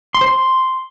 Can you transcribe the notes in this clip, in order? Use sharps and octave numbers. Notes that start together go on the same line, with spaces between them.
C6
C5
C6